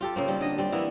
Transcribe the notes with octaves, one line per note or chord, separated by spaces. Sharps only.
F4 G4 A4
C#3 A#3 C4
D#3 G3
D3 D#5
G3 C4
E3 A#3 B3 E4